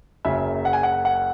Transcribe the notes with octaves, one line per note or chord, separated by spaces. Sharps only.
F#1 F#2 C#3 F#3 E5
F#5
G#5
F#5
F#5